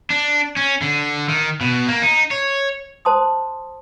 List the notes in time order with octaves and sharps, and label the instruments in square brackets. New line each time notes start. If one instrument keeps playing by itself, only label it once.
[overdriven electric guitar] D4
C#4
D3
D#3
B2
A#3
D#4
C#5
[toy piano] C5 A5 C6 D#6